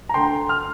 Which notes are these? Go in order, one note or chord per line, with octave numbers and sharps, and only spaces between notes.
A#5
D2 G5 C6
F6